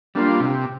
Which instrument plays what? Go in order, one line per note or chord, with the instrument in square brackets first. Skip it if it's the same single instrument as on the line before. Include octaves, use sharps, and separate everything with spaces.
[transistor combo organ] G3 A#3 F4 [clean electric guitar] D4
[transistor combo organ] C3